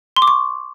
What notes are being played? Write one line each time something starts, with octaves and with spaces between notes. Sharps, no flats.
C6
D6
C#6